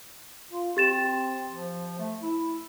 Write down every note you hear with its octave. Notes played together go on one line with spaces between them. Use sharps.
F4
C4 G4 A6 E7
F3
A3
E4